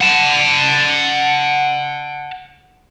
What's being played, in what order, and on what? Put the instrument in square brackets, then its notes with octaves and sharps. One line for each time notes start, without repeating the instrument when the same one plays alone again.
[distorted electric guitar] F#5 A5